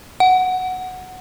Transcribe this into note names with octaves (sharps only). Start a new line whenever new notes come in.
F#5